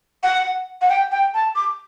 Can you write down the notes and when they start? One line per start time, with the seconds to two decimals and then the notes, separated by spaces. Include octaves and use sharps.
0.23 F#5
0.82 F#5
0.89 G5
1.12 G5
1.34 A5
1.56 D6